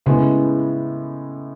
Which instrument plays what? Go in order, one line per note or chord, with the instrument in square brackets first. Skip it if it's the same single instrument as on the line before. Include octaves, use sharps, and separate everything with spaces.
[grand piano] A2 G#3 B3 E4 [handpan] C#3